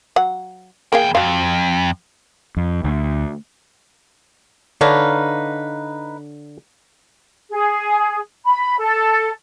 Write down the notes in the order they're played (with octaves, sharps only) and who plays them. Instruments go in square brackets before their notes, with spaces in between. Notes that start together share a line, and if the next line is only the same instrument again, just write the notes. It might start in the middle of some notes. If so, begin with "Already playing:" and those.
[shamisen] F#3 F#5
[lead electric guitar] E2 G5 [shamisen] A#3 G#4 F5
[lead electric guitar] F2 [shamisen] F#4 F5
[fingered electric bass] F2
D2
[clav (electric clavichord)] D3 D4 C#5 [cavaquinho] D#4 B4 F5
[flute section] G#4
B5
A4